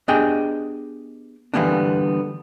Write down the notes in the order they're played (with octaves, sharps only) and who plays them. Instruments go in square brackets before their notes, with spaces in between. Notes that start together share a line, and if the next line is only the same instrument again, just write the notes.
[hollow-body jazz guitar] B3 D4 G4 G#4 D#5 G5
D3 E3 G3 A#3 B3 D4